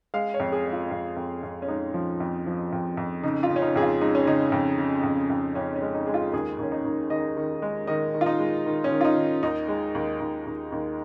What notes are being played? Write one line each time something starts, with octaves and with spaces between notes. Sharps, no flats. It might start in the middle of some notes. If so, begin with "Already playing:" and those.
G#3 F5
C#5
F2
G#4
G#3
F4
F2
F2
F2
C#4
G#3 D#4
F3
F2
F3
F2
F2
C#3 D#4
F4
C#3
C#4
D#4
F2 G#4
F4
G#3 D#4
C#4
C#3 D#4
F2
C#3
F2
F2
F2 C#4
C#4
G#3
D#4
G#3 G#4
F4
D#2 G#4
D#2 C#4
D#4
D#2
D#3 D#5
D#3
G#3
D#3 D#5
D#3
F4
D#4
G#3
D#3
C#4
D#3
F4
D#4
D#3
D#2 D#4
G#3
D#2
D#2
D#2
D#2